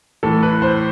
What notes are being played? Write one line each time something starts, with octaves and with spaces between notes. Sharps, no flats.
A2 E3 A4
B4
C5